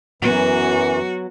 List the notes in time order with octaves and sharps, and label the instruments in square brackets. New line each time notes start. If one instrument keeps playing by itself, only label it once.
[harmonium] F#2 E3 [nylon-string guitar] F#3 B3 [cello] F#4